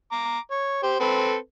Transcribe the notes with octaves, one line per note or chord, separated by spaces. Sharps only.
A#5 D6
C#5
G4 C5
C4 A4 B4